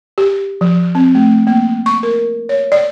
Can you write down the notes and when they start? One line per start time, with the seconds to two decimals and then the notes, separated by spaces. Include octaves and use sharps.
0.18 G4
0.61 F3
0.95 C4
1.15 A3
1.47 A#3
1.86 C#6
2.03 A#4
2.49 C#5
2.72 D5